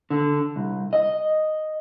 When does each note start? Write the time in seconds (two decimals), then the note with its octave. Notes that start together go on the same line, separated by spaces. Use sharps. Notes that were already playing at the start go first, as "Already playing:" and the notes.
0.10 D3
0.56 C2
0.93 D#5